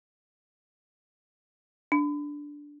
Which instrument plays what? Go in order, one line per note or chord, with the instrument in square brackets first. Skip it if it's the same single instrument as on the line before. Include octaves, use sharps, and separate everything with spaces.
[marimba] D4